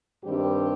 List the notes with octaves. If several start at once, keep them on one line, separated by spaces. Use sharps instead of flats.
G2 D#3 G3 C4 G4